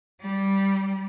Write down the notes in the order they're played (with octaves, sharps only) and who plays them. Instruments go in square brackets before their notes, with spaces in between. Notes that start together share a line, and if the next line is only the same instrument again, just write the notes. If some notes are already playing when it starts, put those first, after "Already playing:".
[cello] G3